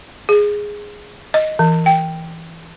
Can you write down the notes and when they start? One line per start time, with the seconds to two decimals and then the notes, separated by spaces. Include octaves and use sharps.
0.29 G#4
1.34 D#5
1.59 E3
1.86 G5